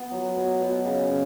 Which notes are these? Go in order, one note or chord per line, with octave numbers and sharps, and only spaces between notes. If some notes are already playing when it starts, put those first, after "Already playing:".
Already playing: B3
F#3
B2 B3
B2
C#3
C#3